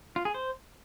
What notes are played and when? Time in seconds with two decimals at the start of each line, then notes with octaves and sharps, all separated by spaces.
0.16 F4
0.25 G#4
0.34 C5